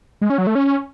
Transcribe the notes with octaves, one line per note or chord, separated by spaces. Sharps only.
G#3
C#4
F#3
A3
C#4